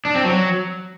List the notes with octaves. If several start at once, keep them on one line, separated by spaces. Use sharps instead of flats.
D4
C4
F#3